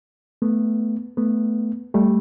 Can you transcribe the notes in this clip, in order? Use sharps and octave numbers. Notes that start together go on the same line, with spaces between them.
A3 B3
A3 B3
G3 A3